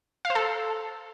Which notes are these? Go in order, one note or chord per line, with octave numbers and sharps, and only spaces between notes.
F5
C5
A4